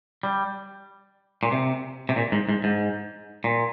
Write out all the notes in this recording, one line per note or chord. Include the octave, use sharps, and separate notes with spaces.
G3
A#2
C3
C3
A#2
G#2
G#2
G#2
A#2